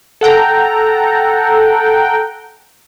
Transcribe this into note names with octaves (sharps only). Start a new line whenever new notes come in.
A4 F#5 G5 A#5